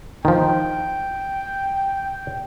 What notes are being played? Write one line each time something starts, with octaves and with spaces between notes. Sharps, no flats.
D#3 F3 G5